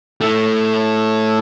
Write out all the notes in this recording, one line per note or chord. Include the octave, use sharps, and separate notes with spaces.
A3 E4